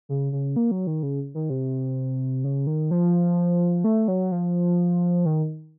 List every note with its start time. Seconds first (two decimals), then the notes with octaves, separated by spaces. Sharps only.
0.09 C#3
0.32 C#3
0.56 A#3
0.71 F#3
0.87 D#3
1.03 C#3
1.34 D#3
1.50 C3
2.44 C#3
2.67 D#3
2.91 F3
3.84 A3
4.08 F#3
4.32 F3
5.25 D#3